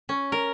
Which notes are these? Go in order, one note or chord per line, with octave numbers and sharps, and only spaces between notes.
C#4
A#4